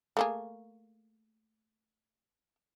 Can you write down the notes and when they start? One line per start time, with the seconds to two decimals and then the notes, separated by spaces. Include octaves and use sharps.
0.17 A3 A#3 G#4